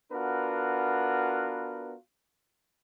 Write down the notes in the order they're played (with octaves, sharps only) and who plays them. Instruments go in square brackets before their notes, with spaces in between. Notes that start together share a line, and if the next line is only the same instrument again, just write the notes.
[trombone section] B3 D4 F4 F#4 A#4 B4